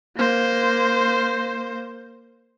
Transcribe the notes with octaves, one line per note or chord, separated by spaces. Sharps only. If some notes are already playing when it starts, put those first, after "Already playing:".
A#3 C5